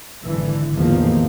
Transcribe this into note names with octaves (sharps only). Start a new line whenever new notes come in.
G#1 D3 E3
A1 E2 D#3 F3 A#3